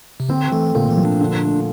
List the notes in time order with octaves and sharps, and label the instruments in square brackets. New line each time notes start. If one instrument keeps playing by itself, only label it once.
[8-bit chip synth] C3
[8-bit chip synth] D3 [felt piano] C4
[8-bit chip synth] E3 [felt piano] A3
[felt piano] A#2 [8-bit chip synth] D3
[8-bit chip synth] E3
[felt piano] F3
[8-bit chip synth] D4
[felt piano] D3
A3